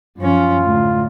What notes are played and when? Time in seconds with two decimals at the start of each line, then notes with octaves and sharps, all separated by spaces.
0.18 F#2 F3 C#4 F4
0.63 D2 A2